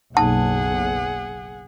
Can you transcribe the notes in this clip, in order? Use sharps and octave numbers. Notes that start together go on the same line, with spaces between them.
F#1 B1 A#3 D#4 G#4 F#5 A5